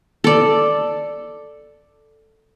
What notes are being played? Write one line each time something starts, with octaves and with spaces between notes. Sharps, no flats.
A4 D5